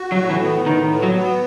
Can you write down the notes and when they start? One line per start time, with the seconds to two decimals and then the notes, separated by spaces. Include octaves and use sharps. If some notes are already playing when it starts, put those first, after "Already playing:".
Already playing: F#4
0.12 F#3
0.18 A2
0.30 E3
0.42 B3
0.66 A2 D#3
0.90 B3
1.03 F#3
1.15 B3